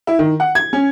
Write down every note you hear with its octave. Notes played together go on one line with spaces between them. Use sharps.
E4
D#3
F#5
G#6
C#4